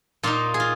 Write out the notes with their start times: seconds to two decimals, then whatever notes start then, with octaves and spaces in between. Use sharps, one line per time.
0.23 A#2 A#3 D#4 F4
0.54 G#4
0.60 F4